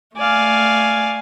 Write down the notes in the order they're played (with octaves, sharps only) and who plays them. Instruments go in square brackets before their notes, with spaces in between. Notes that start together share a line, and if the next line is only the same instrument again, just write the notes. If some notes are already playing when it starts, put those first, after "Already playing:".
[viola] A3 G#5 [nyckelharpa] D5 F5